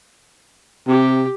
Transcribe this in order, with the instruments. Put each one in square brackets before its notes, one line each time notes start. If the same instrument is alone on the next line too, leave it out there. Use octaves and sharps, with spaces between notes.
[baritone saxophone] C3 [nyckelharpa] G4